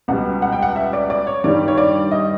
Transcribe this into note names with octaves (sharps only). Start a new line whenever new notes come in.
C#2 B2 G3 F#5
F#5
G5
F#5
E5
D5
D5
C#5
G2 D#3 G3 D5
C#5
D5
D#5